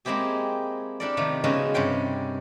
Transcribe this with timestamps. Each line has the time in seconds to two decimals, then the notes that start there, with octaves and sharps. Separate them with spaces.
0.05 G#3 A#3 C4 E4 G4 G#4
1.00 D4 E4 G4 A4 A#4 D5
1.17 C3 D#3 F3 A3 A#3
1.44 C#3 F3 G#3 B3 D#4 F#4
1.74 G2 C3 C#4 G5 C6